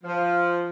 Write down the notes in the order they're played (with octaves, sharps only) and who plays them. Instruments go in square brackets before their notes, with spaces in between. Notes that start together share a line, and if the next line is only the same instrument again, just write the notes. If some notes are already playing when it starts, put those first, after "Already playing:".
[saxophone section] F3